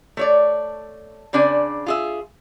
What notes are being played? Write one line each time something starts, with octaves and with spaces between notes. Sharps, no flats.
A3 C#5 D5
C#3 C4 D4 D5 G#5
F4 G#4 E5